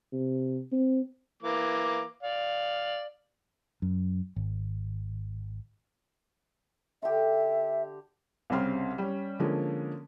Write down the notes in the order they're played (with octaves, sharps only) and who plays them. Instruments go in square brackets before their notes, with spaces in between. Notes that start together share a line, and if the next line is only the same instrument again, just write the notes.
[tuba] C3
C4
[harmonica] E3 A#3 D6
D5 F5
[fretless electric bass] F#2
G#1
[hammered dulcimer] D3 G4 [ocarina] E5
[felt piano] C2 C#3 G3 C4 C6 F6
G3 C#4
D3 F3 G#3 A#3 C#4